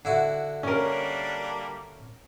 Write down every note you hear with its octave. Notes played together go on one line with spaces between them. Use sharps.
D3 E4 F#4
G3 A#3 C#4 D4 A#4